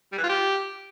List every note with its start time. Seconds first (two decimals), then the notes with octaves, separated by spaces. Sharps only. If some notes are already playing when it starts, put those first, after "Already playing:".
0.12 G3
0.18 E3
0.24 F4
0.29 G4